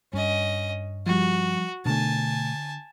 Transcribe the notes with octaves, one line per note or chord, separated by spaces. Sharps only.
G2 C#4 D#5
F3 G3 F#4
B2 D3 A3 G#5 A5